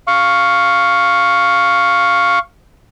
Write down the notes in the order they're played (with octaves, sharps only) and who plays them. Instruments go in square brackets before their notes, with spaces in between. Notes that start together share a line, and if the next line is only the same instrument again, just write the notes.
[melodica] F5 C#6